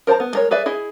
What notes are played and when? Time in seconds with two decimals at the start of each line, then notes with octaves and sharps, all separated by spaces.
0.07 A#4 C5 G5 A5 A#5
0.20 B3
0.33 G#3 A#4 C#5
0.51 G#4 B4 D5 E5
0.66 E4 G#4 D#5